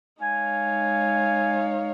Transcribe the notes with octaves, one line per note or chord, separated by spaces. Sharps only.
G#3 D#4 C#5 F5 G#5